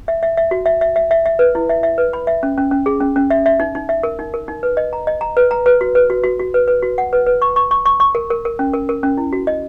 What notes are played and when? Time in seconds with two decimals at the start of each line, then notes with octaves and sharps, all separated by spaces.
0.08 E5
0.23 E5
0.37 E5
0.51 F#4
0.66 E5
0.81 E5
0.96 E5
1.11 E5
1.26 E5
1.39 B4
1.55 E4
1.69 E5
1.83 E5
1.98 B4
2.13 B5
2.27 E5
2.43 C#4
2.58 C#4
2.71 C#4
2.86 G#4
3.01 C#4
3.16 C#4
3.30 E5
3.46 E5
3.60 D#4
3.75 D#4
3.89 E5
4.03 A#4
4.19 D#4
4.34 A#4
4.48 D#4
4.63 B4
4.77 D#5
4.93 A#5
5.07 D#5
5.21 A#5
5.37 B4
5.51 A#5
5.66 B4
5.81 F#4
5.95 B4
6.10 F#4
6.24 F#4
6.39 F#4
6.54 B4
6.68 B4
6.82 F#4
6.98 F#5
7.13 B4
7.26 B4
7.42 C#6
7.56 C#6
7.71 C#6
7.85 C#6
8.00 C#6
8.15 A#4
8.30 A#4
8.45 A#4
8.59 C#4
8.73 A#4
8.89 A#4
9.03 C#4
9.18 E4
9.33 F#4
9.47 D#5